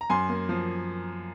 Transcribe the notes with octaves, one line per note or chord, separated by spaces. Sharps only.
A#5
F#2 G#5 C6
A#3
F3